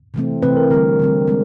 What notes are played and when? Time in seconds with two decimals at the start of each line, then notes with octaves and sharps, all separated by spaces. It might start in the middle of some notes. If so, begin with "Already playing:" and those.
0.14 C3 E3 A3 C4
0.42 C3 E3 A3 C4 B4
0.57 A#4
0.70 D3 G3 C4 A#4
0.99 D3 G3 C4
1.28 G#3 C4